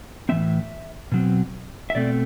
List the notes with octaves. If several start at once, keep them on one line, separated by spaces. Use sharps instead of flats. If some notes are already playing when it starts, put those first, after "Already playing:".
A2 E3 G3 C4 E5
B2 F#3 C4
E5
B2 A3 C4 D5